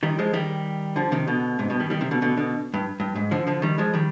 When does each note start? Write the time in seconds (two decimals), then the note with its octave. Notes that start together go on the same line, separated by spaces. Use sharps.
0.03 D#3 G3
0.19 F3 G#3
0.33 D#3 G3
0.96 D3 F3
1.12 C3 D#3
1.27 B2 D3
1.59 G#2 C3
1.70 G2 B2
1.80 D#3 G3
1.90 D#3 G3
2.01 C3 D#3
2.11 B2 D3
2.22 B2 D3
2.37 B2 D3
2.74 G2
3.00 G2
3.16 G#2
3.31 D3 F3
3.47 D3 F3
3.62 D#3 G3
3.78 F3 G#3
3.94 D#3 G3